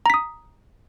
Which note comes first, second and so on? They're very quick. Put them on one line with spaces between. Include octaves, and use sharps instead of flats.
A#5 B6 D#6